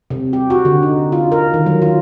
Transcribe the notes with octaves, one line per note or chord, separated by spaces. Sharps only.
C3
G4
F#4
D3
D#4
F4
A#4
D#3
F#3
F4